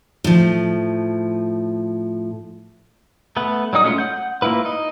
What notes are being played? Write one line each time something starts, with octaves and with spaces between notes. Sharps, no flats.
A2 F3
A3 B3 B4
F#3 G3 D#4 D#6
G#3 A3 C#4 D4 F4
F#5 G6
A#3 B3 E4 F4 B4
D#4 D#5